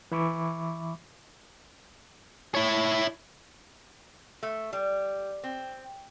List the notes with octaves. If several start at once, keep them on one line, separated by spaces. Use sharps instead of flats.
E3 E5 B5 C#6 D6
E4 C#5
A3
G3
C4